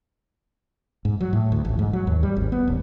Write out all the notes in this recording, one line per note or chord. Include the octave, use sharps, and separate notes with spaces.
G#2
F#3
A2
D2
A1
G#2
F#3
D#2
G3
G#1
B3
D#1